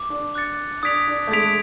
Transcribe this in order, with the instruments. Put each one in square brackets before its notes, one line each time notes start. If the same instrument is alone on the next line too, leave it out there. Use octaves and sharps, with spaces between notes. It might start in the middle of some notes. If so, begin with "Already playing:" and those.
Already playing: [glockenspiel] D6
[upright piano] D4
[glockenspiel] D6 F#6 A6 C#7
[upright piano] D4 [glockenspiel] D#6 G#6 B6 D7 F7
[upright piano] D4
A3
[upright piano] G#3 [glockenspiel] D#6 G#6 B6 D7 F7